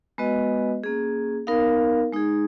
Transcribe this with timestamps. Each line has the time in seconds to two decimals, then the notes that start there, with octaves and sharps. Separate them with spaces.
0.18 G#3 B3 F#4 B4 D#5
0.84 A#3 C#4 G#4
1.47 B3 D#4 A#4 F5
2.13 G#3 D#4 G#4